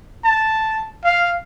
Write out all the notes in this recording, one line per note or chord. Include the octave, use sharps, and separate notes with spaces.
A5
F5